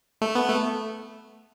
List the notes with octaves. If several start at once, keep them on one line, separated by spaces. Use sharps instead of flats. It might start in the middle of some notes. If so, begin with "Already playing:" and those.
A3
B3
A3